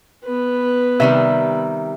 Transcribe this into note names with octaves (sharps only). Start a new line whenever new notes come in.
B3 B4
C3 D#3 G3 E5